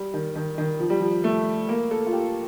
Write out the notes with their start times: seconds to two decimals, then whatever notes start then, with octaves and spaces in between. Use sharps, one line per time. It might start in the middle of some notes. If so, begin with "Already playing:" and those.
Already playing: G3
0.14 D#3
0.35 D#3
0.58 D#3
0.80 F3
0.90 G3
1.00 F3
1.24 A3
1.69 A#3
1.91 A4
2.07 F4
2.13 G4